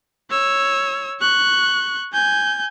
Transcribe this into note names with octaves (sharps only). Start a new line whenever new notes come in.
C#5 E6
C#6 F#6
G#5 G6